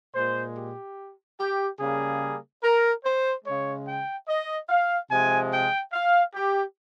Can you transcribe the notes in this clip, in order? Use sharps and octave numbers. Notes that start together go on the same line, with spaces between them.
A#2 G#3 C5
G4
G4
C#3 G3 A#3 G#4
A#4
C5
C#3 G#3 C#5
G5
D#5
F5
C3 F3 G#3 G#5
G5
F5
G4